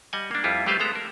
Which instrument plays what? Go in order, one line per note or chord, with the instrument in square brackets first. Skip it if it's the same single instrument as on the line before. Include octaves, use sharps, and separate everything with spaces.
[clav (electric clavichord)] G3 D#5 F#5 G#5
A#3 D4
F2 G3 E4 F4
G3 A3 G4 B4 C5 F5
G#3 B3 A4 A#5
A#4